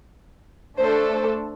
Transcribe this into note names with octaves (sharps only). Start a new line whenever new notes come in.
A3 D4 A4 C5
C5